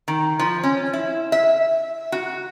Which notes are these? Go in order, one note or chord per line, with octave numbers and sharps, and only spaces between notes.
D#3
F3
C#4
E4
E5
F#4